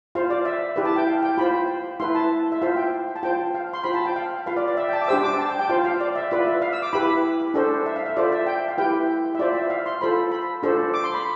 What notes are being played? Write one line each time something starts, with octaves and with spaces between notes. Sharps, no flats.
F4 C5 F5
D5
E5
E4 G4 B4
A5
G5
F5
G5
F4 C5 B5
E4 B4 C6
A5
E5
F4 C5 F5
G5
A5
F4 C5 G5
F5
C6
F4 C5 B5
A5
G5
F5
F4 B4 F5
D5
D5
E5
G5
A5
D6
D4 G4 C5 E6
D6
A5
G5
G5
F4 C5 F5
F5
D5
E5
F4 B4 D5
E5
F5
E6
D6
E4 G4 B4 B5
D4 A4 C5
E5
F5
E5
F4 A4 C5 D5
E5
G5
F5
E4 G4 B4 G5
E5
F4 C5 D5
E5
F5
C6
F4 A4 C5 B5
B5
D4 F4 A4 C5
D6
C6
B5